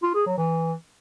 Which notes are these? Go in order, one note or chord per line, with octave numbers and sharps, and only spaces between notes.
F4
G#4
F#3
E3